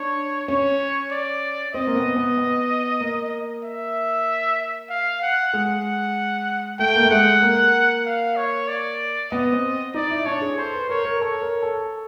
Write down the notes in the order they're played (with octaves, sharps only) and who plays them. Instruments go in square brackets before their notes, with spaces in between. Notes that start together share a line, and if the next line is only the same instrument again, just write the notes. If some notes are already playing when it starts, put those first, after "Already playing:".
Already playing: [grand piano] D4 [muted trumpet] C#5
[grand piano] C#4 [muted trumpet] C#5
[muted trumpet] D5
[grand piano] C4 [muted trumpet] D#5
[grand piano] A#3
B3
B3
B3
A#3
[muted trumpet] E5
F5
F#5
[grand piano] G#3 [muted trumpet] F#5
[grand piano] A3 [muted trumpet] G5
[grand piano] A#3
A3
[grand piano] G#3 [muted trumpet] F#5
[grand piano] A#3
[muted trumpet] F5
C#5
D5
[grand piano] B3 [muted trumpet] D#5
[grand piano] C4
[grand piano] D#4 [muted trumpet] D5
[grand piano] E4
[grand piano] D4 [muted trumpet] C#5
[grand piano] G#4
[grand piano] A4 [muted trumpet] C5
[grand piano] B4
[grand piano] A#4 [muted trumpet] C#5
[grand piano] A#4
[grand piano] A4 [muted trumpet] C#5
[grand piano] A#4
A4